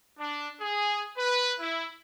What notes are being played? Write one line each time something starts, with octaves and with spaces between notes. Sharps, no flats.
D4
G#4
B4
E4